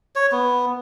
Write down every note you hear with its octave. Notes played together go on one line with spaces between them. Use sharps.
C#5
B3